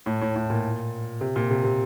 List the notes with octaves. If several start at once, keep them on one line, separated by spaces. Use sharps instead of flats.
A2
A2
A2
A#2
C3
A#2
C3
C3